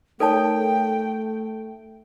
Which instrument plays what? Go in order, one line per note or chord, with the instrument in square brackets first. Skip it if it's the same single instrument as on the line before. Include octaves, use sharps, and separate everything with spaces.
[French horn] A3 [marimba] D#4 A#4 C#5 [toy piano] A4 D5 A5 [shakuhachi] G5